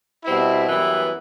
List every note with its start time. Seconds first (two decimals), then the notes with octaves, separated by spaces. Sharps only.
0.24 B2 G3 C4 E4
0.68 F#2 E3 G3 B3 E4